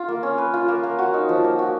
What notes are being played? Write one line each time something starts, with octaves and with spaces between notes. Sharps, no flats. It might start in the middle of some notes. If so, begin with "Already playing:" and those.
Already playing: F4
A#3
C#4
B4
F4
A#3
A#3
F#4
D#4
F3
A#3
F#4